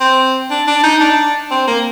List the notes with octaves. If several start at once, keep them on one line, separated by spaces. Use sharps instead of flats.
C4
D4
D4
D#4
D4
C4
A#3